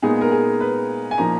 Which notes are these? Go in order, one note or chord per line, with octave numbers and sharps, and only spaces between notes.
A#2 G#3 B3 D#4 G#4
A#4
G#4
B4
G#5
A#2 F3 A#3 D#4 A#5